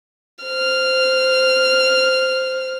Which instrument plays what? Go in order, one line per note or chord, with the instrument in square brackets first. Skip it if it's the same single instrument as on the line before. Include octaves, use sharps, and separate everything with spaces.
[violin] C5 F6